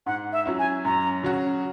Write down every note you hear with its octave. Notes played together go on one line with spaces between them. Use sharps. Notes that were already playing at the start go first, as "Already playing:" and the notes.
G#2 F#5
E5
F#3 C#4 E4
G#5
F#2 A#5
C#3 F#3 C#4 F#4